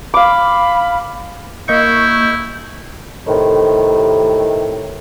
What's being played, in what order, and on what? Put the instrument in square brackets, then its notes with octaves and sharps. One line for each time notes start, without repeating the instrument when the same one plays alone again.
[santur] F5 D6 [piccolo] B5
[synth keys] A#3 D#5 C#6 [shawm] E4 [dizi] G6
[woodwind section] A2 C3 D#3